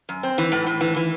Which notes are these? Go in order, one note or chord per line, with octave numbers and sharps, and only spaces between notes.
F#2
C4
E3
A2
A2
E3
E3